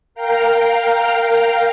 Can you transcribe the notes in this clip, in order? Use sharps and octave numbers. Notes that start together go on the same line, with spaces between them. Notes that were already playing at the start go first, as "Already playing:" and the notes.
A#4 F5 G5 A#5